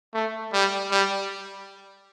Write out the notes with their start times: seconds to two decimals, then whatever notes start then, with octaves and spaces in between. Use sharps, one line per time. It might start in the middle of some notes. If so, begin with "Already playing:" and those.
0.14 A3
0.53 G3
0.91 G3